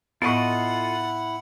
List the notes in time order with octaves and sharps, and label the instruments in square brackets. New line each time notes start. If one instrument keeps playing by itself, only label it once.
[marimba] A2 B3 [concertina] E4 [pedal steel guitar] F4 A4 D#5 [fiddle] F#5